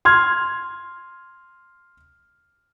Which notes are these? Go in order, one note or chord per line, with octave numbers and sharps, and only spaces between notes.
C6 F6 G#6